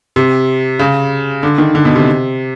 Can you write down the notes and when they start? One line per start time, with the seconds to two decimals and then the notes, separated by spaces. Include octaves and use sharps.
0.16 C3
0.79 C#3
1.43 D3
1.58 D#3
1.75 D3
1.85 B2
1.96 C3